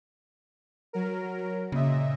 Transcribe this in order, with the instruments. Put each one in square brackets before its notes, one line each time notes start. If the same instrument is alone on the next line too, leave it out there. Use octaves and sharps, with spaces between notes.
[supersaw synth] F#3 A#4
[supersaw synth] A#2 D#5 E5 [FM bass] C#3